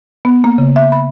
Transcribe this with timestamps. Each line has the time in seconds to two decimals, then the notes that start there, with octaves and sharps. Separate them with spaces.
0.25 B3
0.44 A#3
0.58 C#3
0.76 E5
0.92 B5